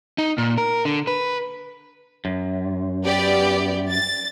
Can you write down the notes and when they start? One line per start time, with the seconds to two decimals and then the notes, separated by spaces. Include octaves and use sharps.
0.18 D#4
0.38 A#2
0.58 A#4
0.85 D3
1.07 B4
2.25 F#2
3.05 B3 G4 D5
3.90 A6